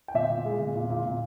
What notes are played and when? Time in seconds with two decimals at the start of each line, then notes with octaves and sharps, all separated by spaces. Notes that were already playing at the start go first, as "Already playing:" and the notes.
0.08 G5
0.14 A#2 E5
0.30 A#2
0.45 G#3
0.60 A#2
0.75 A#2
0.90 A#2
1.05 A#2